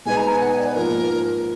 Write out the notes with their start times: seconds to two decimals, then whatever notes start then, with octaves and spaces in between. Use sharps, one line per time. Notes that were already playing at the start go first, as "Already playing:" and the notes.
0.05 B2 G#3 D#4 G#4 B4 G#5
0.17 A#5
0.28 G#5
0.41 F#5
0.49 G#5
0.58 D5
0.66 B4
0.74 G#2 F3 A#3 F4 A#4